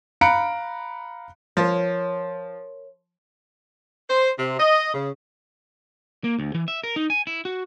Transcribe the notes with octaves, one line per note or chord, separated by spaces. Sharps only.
F5 A#5 B5 F#6 C#7 D7
F3 A#4 C#5
C5
C3
D#5
C#3
A#3
D2
E3
E5
A#4
D#4
G#5
E4
F#4